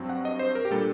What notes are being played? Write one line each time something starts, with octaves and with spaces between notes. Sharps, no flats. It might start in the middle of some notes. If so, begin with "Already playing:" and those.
Already playing: G2 F#3 C4
F#5
D#5
C5
A#4
G4
A#2 G3 A#3 D4 A4